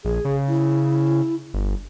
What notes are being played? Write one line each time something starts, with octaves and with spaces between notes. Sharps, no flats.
A#1 G#4
C#3
E4
G1